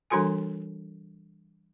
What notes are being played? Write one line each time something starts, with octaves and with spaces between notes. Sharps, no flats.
E3 G3 D4 F#4 A4 G#5